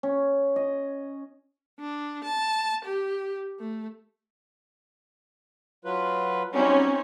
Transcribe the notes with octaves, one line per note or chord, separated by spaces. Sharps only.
C#4
D#5
D4
A5
G4
A3
F#3 F4 B4
F#3 G3 C4 C#4 D#4 G4